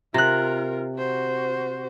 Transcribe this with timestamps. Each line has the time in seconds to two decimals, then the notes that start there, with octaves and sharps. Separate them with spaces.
0.14 C3 F4 A#4 F#6 A#6
0.97 F#4 C5